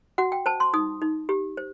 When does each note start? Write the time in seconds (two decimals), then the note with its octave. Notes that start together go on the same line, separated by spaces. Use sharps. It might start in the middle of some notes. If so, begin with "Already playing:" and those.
0.18 F#4 F#5
0.32 G5
0.46 C5 A5
0.60 C6
0.73 D#4 D#6
1.02 D#4
1.29 G4
1.57 C5